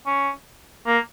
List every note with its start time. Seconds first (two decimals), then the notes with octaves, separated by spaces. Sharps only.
0.06 C#4
0.86 A#3